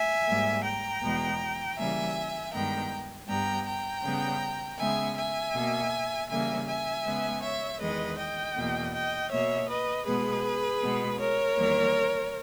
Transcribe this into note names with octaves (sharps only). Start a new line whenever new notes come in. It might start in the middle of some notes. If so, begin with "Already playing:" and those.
Already playing: E5 G#5
G#2 G3 A#3
G5 A#5
E2 B2 G#3 B3
C#3 E3 G3 A#3 E5 G#5
G2 D#3 G#3 B3 G5 A#5
G2 G3 B3 G5 A#5
G5 A#5
C#3 G3 B3
C#3 G#3 B3 E5 G#5
E5 G#5
B2 A#3
C#3 E3 G3 A#3 E5 G#5
E5 G#5
C#3 G#3 B3
C#5 E5
E2 D#3 G#3 B4 D#5
D#5 G5
E2 B2 A#3
D#5 G5
B2 A#3 C#5 E5
B4 D#5
B2 G#3 B3 G#4 B4
B2 G#3 B3
A#4 C#5
E2 D#3 G3 A#3